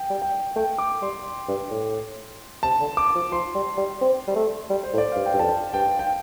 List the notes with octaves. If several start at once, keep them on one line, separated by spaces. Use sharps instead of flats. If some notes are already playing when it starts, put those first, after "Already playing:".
Already playing: G5
G3
G5
A3 G5
D6
G3 C6
G2
A2
C3 A5
D3
D6
F3
F3 C6
G3
G3
C4
G3
A3
G3
C5
A2
D5
G2 F5
G5
G2
F2 A5
G2 G5
G5